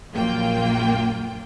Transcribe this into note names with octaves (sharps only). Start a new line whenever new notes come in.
A#1 F#2 A#3 F4 G5